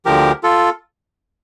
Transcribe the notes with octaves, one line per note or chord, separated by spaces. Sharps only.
D2 D3 F3 G4 A#4
F4 A4